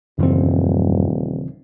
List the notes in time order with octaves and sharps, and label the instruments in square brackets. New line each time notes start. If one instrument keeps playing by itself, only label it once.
[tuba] D#1 [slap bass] F#2 G3 [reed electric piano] C#3 E3 C4